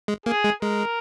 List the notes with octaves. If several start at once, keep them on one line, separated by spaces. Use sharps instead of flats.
G#3
A#3 G#4
G#3
G#3 A#4